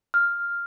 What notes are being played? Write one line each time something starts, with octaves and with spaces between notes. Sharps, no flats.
F6